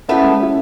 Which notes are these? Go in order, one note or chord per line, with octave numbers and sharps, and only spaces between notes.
A3 B3 C#4 E4
G#3
C#4 E4